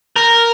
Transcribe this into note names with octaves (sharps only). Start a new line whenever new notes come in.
A#4